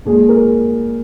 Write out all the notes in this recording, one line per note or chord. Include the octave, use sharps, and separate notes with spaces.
A#2 G#3 G#4
A#4